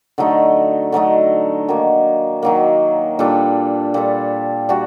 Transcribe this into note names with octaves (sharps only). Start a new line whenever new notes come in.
D3 F#3 A3 D#4
D3 F#3 A3 D#4
D#3 F#3 A#3
D#3 F#3 A#3
A#2 G3 D4 A4
A#2 G3 D4 A4
G3 D4 F#4